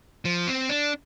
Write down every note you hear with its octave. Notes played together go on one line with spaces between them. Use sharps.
F3
C4
D4